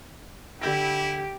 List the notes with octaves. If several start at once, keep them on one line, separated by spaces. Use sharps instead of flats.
D3 E4 G4 G6 A#6